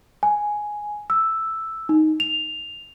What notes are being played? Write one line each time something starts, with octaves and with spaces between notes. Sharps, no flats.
G#5
E6
D#4
F7